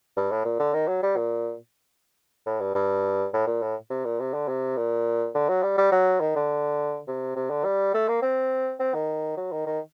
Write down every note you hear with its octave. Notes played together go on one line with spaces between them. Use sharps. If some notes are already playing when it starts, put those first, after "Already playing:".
G2
A2
A#2
D3
D#3
F#3
G3
A#2
A2
G2
G2
A2
A#2
A2
C3
A#2
C3
D3
C3
A#2
D3
F#3
G3
G3
F#3
D#3
D3
C3
C3
D3
G3
A3
A#3
C4
C4
D#3
F#3
D#3
D#3